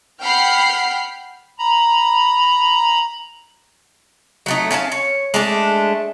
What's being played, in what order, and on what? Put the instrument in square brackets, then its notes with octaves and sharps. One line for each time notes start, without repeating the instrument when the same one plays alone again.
[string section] F#5 G5 B5 F6 C7
[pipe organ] A#5 B5
[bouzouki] F#3 A3 D#4
C#4 F4 G#5 A5
C#5
G#3 A3 D4